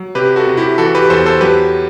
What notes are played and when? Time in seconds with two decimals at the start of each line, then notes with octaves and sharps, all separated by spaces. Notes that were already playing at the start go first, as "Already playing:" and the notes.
Already playing: F#3
0.15 C3 G4 B4
0.36 F#4 A4
0.47 C3
0.57 E4 G4
0.78 E3 F#4 A4
0.95 G4 B4
1.10 E2 A4 C5
1.26 A4 C5
1.41 F#3 G4 B4